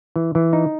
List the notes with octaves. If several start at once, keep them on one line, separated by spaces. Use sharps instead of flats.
E3
E3
D#4